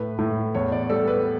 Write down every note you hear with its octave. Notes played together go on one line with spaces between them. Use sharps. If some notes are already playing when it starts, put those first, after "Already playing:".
Already playing: A2 B4
A2
E2 C#5
D5
G3 A4
B4